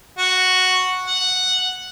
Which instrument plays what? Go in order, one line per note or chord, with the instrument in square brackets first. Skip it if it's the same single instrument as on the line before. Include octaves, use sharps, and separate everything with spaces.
[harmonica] F#4
F#5